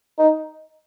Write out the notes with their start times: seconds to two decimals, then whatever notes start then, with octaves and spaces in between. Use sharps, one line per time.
0.19 D#4